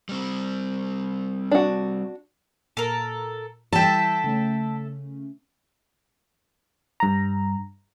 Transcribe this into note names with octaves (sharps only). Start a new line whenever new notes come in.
G3 C4
D4 F#4
A#2 A4 A#4
E3 G3 E4 A4 E5 G5 A5
C#3 A3 C#4
G2 A#5